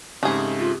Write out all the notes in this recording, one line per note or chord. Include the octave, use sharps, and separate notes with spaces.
G#2 C#3 A3 C4 G4 G#4 D#6
F4